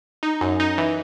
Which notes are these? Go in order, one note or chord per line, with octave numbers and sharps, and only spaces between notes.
D#4
F#2
D#4
E3